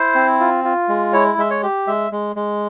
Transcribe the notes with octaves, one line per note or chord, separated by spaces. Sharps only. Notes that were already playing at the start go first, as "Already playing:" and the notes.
Already playing: E4 C5
C4
F4
F4
G#3
E4 C#5
G#3 E5
C#5
G4
G#3 E5
G#3
G#3